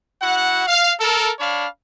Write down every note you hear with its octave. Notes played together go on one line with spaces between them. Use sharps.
E4 F#4 F#5
F5
A4 A#4
D4 C#5 F5 B5